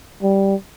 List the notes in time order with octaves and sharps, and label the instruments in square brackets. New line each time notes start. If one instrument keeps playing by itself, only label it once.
[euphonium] G3